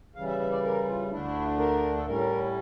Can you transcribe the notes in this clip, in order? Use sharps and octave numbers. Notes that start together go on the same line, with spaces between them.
C#3 E3 G3 F5
E5
E5
D5
A#4
F4
D2 D3 A3 D4 E4
A#4
A4
A2 G3 C#4 A#4